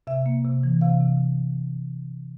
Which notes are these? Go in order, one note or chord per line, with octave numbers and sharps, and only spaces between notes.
C3 E5
A#3
C3
E3
C3 F5
C3